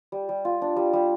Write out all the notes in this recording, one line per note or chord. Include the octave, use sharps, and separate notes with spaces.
G3
G3
F4
D4
G3
G3